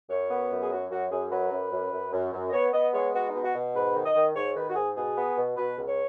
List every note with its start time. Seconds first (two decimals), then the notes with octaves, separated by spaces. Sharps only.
0.10 F#2 C#5
0.30 B3
0.50 F#2
0.62 G#4
0.70 F#3 F#4
0.91 F#2 F#4
1.11 F#2 G#4
1.31 F#3 B4
1.51 F#2
1.72 F#2
1.92 F#2
2.12 F#2
2.33 F#2
2.49 D#5
2.53 B3 C#5
2.73 B3 D#5
2.93 G#3 C#5
3.13 B3 F#4
3.29 D#4
3.34 B2
3.44 F#4
3.54 B2
3.74 G#2 B4
3.95 D#3
4.05 D#5
4.15 D#3
4.35 G#2 C#5
4.56 D#3 B4
4.69 F#4
4.75 G#2 G#4
4.96 B2 G#4
5.16 B3
5.36 B2
5.57 B2 B4
5.77 C#2
5.87 C#5